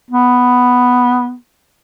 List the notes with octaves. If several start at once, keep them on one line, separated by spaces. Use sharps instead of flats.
B3